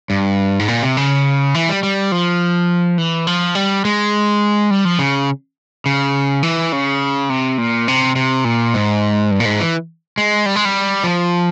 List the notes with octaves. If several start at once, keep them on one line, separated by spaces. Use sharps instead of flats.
G2
G#2
A#2
C3
C#3
E3
G3
G3
F3
E3
F3
G3
G#3
G3
F3
C#3
C#3
E3
C#3
C3
A#2
C3
C3
A#2
G#2
G2
A#2
G#2
E3
G#3
G3
G#3
G3
F3